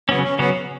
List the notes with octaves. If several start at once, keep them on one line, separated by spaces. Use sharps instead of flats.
C#3 F#3 B3 C#4
C#4
C#3 F#3 B3 C#4